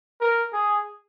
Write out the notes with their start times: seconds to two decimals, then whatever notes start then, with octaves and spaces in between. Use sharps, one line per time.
0.21 A#4
0.53 G#4